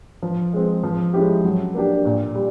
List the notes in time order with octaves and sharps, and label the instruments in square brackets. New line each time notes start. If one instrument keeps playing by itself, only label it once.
[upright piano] F3
G#3 C4
F3
G#3 C#4 E4 G4
F#3
A#3 D4 G4
A#2
G3